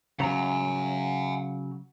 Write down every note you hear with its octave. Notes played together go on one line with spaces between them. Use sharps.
C#3 F#3 F#5 G#5 A#5